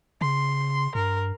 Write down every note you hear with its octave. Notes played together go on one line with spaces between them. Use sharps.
C#3 C6
G2 A#4